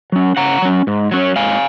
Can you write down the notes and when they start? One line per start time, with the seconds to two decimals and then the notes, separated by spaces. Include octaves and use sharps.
0.12 F#3 C#4
0.37 C#3 F#5 A#5
0.62 F#3 C#4
0.87 G#2
1.12 F#3 C#4
1.36 G#2 F5 G#5